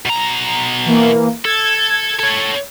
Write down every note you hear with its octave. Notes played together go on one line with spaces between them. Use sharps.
B2 A#5
E3 A#3
A4 G#6
A4 C#5